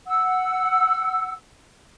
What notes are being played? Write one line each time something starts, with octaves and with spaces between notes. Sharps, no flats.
F#5 E6